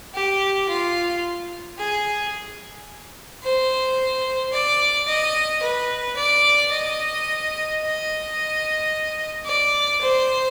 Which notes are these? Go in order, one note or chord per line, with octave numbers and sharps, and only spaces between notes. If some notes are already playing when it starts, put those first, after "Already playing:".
G4
F4
G#4
C5
D5
D#5
B4
D5
D#5
D#5
D5
C5